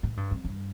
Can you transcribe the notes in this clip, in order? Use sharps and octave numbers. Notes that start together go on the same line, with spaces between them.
A2
G2
F2
G2